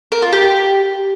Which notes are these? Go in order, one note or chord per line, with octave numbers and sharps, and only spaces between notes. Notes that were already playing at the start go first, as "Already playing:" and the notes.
A#4
F4
G4